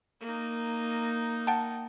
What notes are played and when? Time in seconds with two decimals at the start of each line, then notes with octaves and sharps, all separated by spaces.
0.21 A#3 D#4
1.47 F#5 G5 A5